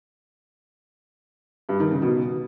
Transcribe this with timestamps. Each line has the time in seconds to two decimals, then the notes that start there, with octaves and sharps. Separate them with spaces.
1.69 G2
1.80 D#3
1.91 C#3
2.02 B2